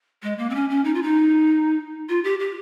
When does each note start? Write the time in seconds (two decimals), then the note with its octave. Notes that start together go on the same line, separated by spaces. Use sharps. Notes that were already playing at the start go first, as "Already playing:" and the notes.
0.23 G#3
0.38 A#3
0.50 C4
0.54 C#4
0.70 C#4
0.85 D#4
0.95 F4
1.02 D#4
2.09 F4
2.24 G4
2.40 G4